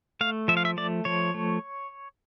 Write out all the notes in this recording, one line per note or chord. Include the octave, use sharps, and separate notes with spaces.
A3 F5
F3 E5
F5
E5
A3 D5
F3 C#5
A3